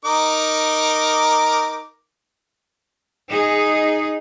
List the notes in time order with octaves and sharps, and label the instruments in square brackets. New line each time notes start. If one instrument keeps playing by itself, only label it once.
[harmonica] D#4 A#4 D6
[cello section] D#4 G#4